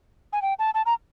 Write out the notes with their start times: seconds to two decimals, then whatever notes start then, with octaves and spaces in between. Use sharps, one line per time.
0.33 G#5
0.42 G5
0.59 A5
0.74 A5
0.86 A#5